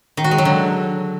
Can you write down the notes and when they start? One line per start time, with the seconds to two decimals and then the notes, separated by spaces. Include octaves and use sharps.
0.17 D#3
0.24 F#4
0.31 G#3
0.38 F#3
0.45 D3